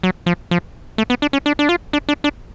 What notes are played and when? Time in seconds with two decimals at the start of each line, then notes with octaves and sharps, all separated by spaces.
0.03 F#3
0.26 F3
0.51 F3
0.98 A3
1.10 B3
1.22 D4
1.33 C#4
1.46 D4
1.59 D4
1.69 F4
1.93 D4
2.09 D4
2.24 D4